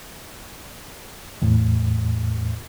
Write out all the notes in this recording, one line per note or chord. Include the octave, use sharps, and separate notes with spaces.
E2 A2